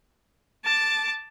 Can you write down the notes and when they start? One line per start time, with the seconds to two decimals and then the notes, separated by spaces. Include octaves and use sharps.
0.65 A5 D6